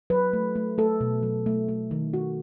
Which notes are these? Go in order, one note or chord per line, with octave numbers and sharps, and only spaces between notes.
F#3 B4
A3
A3
A3 A4
B2
F#3
A3
A3
D#3
A3 F#4